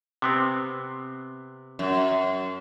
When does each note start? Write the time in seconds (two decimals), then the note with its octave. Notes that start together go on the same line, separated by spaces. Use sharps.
0.22 C3 B3 C4
1.79 F#2